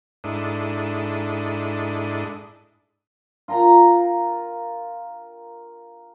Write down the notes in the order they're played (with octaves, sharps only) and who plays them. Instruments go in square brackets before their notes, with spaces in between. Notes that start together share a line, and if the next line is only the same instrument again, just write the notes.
[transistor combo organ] G#2 D4 E4 A4 D#6
[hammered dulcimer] F4 A#4 G5 A#5